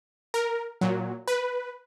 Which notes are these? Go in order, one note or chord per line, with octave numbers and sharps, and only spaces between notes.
A#4
A#2 F#3
B4